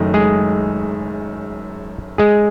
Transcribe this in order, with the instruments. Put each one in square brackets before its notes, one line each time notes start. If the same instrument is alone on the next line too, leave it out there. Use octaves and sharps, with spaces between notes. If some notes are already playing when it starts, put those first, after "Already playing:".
Already playing: [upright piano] F#1 F#2 D#3 A3 D#4
[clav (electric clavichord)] G#3 G#4
G#3 G#4